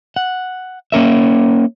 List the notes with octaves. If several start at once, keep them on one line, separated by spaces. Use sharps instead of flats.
F#5
A#3 C#4 A#4 E5